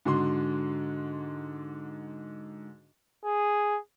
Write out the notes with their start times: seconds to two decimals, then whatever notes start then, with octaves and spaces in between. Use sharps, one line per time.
0.05 G#2 D3 F#4 C6
3.24 G#4